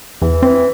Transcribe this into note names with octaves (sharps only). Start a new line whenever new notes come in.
E2 E3
E3 C4